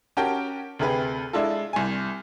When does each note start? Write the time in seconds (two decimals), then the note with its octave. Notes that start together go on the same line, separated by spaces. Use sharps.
0.17 C#4 F#4 G4 A#4 G5 A5
0.79 D2 C3 G#4 B4
1.33 G#3 D4 E4 F4 A4
1.73 C2 G#5